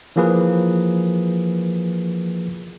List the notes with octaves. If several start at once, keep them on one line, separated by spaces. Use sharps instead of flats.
E3 F3 A#3 G#4 B4